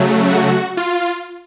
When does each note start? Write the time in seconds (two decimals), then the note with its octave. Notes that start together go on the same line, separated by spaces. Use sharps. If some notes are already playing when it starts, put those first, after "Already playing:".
Already playing: C#3 F#3 A3
0.30 F#4
0.77 F4